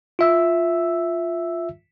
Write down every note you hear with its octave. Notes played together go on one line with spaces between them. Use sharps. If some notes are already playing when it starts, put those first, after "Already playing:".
F4 E5 E6